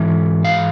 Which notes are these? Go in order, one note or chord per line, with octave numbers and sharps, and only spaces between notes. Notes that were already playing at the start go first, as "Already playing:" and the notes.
Already playing: G#2 E3 E5
F5